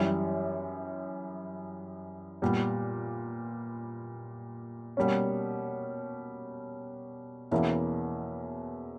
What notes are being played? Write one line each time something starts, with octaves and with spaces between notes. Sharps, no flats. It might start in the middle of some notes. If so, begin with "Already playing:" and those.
Already playing: F#2 E3 G3
A#2 G3 B3
B2 G3 A#3 C#4
E2 B2 A#3 C#4 E4